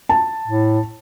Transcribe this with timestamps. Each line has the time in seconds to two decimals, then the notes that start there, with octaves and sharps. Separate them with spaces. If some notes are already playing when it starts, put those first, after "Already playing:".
0.09 A5
0.48 A2